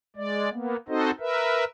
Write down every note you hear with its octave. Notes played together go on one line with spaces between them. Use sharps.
G#3 D5
A#3 B3
C4 D#4 F#4 A4 C5 D#5
A#4 B4 E5